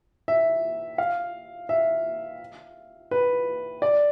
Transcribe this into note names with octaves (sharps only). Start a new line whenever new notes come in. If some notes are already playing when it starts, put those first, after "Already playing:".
E5
F5
E5
B4
D5